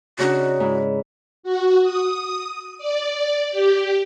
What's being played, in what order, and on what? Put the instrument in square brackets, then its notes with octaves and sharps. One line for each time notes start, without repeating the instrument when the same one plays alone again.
[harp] C#3 D4 D#4 [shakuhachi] F#4
[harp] G#2 E4
[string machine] F#4
D#6
D5
G4